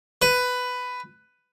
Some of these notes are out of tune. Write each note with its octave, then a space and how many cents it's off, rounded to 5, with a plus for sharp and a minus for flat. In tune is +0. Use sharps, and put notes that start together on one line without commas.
B4 +10